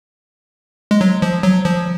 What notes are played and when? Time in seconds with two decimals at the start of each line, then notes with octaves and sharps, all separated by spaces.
0.91 G#3
1.01 F#3
1.22 F3
1.43 F#3
1.65 F3